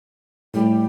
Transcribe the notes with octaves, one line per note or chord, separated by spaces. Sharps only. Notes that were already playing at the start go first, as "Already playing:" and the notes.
A2 G3